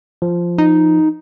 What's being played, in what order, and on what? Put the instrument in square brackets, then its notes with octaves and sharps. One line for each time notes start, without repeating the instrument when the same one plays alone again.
[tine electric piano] F3
[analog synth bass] D#4